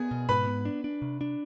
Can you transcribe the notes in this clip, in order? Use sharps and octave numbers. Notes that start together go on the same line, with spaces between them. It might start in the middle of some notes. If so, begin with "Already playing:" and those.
Already playing: B3 G#4 G#5
B2
G#2 B4 B5
B3
D4
D4
C3
D4